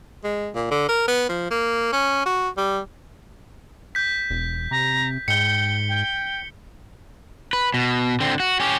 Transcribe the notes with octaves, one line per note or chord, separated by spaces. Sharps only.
G#3
A#2
D3
A#4
B3
F3
A#3
C#4
F#4
G3
G6 B6
E1
C3 A#5
G#2 G5 C#7 G7
G5
B4
B2
D3 C4
F#4
C#4 G4